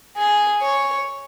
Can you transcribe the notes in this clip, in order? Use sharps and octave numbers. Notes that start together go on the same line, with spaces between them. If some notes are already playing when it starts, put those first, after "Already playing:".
G#4
C#5